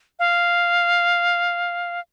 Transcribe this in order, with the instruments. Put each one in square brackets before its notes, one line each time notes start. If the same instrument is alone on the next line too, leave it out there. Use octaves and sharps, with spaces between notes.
[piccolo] F5